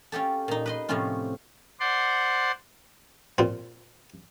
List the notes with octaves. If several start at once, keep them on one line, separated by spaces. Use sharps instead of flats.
C#4 F4 G4 A4
A#2 D#4
B4 D#5 C6
A2 C3 F3 C#4 F4
C5 D5 F#5 C6
A#2 C4